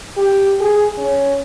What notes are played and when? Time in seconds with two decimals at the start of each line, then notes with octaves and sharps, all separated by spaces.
0.17 G4
0.61 G#4
0.98 C#4